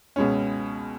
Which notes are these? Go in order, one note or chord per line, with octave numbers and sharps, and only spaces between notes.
C#2 B2 G#3 C#4